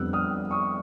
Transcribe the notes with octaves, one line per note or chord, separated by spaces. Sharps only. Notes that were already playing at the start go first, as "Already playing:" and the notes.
Already playing: F2 D3 G3 B3 E6 F#6
D#6 F6
C#6 D#6